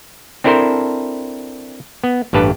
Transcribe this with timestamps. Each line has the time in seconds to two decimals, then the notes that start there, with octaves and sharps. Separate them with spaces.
0.44 C4 D4 E4 A4 A#4 C5
2.04 B3
2.33 A1 G2 G4 B4 A5